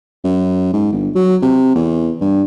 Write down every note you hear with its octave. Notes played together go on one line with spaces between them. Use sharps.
F#2
G#2
G1
F#3
C3
E2
G2